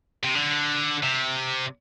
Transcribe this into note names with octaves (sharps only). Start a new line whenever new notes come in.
C3
D3
C3